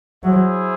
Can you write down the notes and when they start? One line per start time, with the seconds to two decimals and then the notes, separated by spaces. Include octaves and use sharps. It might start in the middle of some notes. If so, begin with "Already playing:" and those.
0.23 F#3 E4 G#4 C5 E5